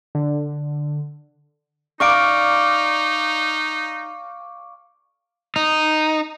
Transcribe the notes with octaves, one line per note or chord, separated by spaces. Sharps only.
D3
D#4 D5 F5 A#5 C#6 D6 D7
D#4